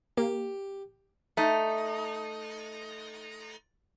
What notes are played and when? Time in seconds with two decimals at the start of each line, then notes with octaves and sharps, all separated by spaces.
0.17 A#3 G4
1.37 A3 D#4